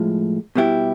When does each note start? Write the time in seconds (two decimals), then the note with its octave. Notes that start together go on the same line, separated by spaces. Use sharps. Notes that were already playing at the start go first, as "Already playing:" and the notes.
Already playing: A2 F3 G#3
0.55 B2 G3 B3 E4 G4